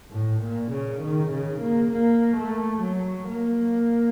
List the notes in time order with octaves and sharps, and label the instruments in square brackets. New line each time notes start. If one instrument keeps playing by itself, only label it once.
[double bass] A2
A#2
C#3
D#3
C#3
A#3
A#3
A3
F#3
A#3